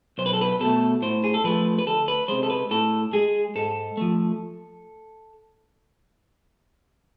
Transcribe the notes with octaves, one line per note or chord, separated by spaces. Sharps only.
B1 C5
B4
A4
B4
B2 A3 A4
A2 C5
G#4
A4
F3 A3 B4
B4
D2 A4
B4
C3 G#3 C5
A4
B4
A2 A4
G#3 G#4
G#2 A4
F3 A3